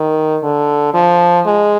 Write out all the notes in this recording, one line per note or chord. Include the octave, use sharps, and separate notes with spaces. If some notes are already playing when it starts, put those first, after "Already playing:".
Already playing: D#3
D3
F3
G#3